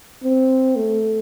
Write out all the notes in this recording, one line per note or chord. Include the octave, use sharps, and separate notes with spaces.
C4
A3